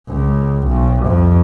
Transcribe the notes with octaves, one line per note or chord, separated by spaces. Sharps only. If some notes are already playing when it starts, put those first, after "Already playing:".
C#2
B1
F2